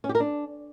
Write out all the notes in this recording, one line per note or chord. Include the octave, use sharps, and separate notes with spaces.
C#4
G4
A#4
D4